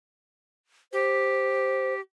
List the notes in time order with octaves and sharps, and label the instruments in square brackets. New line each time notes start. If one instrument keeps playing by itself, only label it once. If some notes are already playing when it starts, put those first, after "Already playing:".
[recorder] G4 [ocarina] C5